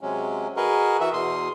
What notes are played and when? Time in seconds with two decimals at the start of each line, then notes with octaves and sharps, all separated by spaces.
0.01 C3 F#3 G#3 C#4
0.57 F#4 G#4 A#4 B4 D#5
1.00 E3 F#4 E5
1.13 E2 B2 C6 D#6